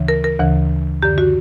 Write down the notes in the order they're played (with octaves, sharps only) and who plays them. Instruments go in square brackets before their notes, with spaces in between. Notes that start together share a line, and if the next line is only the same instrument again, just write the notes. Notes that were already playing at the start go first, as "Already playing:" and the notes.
Already playing: [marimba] D2 C#3 E3
A#4
A#4
D2 C#3 E3
F#2 D3 G4
F#4